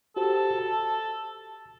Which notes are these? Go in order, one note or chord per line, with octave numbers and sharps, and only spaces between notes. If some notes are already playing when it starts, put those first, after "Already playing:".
F#4 G4 A4 C5
A5